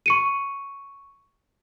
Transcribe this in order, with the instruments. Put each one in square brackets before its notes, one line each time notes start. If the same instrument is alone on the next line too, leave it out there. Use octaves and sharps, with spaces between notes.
[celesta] C#6 C#7 D#7